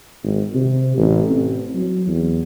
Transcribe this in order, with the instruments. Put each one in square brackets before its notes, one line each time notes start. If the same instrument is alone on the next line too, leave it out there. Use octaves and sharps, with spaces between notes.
[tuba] G#1
C3
A1
C4
F#3
E2